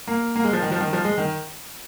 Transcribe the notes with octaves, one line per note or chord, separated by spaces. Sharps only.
A#3
A#3
G#3
F3
D#3
F3
D#3
F3
G#3
D#3